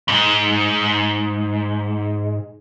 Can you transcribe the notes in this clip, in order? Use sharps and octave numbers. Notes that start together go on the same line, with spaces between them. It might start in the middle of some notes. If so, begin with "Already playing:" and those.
F2 G#2